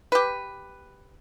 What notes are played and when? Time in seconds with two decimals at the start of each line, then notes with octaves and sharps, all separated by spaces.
0.12 G4 B4